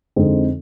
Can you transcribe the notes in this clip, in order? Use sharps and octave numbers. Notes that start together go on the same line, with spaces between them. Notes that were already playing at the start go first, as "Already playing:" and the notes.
F2 D3 G#3 C4 D#4